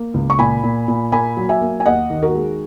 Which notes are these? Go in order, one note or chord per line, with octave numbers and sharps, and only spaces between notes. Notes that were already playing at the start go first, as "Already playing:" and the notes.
Already playing: A#3
C#2
C#6
A#2 G#5 B5
A#2
A#2
A#3 G#5 B5
F#3
E5 G#5
A#3
G#5
D#2 D#5 F#5
D#3
F#4 A#4
G#3